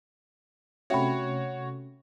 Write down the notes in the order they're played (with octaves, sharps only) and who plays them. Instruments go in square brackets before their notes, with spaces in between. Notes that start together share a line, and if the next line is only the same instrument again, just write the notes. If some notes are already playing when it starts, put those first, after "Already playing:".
[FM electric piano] C3 A3 C#4 [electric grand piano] F#4 C#5 [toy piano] E5 G5 B5